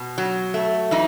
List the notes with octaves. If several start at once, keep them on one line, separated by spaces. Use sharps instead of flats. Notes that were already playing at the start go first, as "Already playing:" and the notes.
Already playing: B2
F#3
A3
E3 D#4